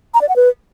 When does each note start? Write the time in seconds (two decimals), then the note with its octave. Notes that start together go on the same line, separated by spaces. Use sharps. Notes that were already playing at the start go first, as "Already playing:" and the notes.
0.14 A#5
0.21 D5
0.29 F#5
0.36 B4